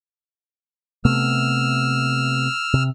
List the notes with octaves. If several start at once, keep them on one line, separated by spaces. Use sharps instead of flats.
C3 A3 B3 E6 F6
C3